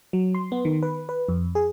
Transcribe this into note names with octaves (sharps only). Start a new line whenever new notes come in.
F#3
C6
B3
D#3
B4
B4
F2
G#4